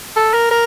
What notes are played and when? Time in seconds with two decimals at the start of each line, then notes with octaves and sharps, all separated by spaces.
0.16 A4
0.34 A#4
0.51 A#4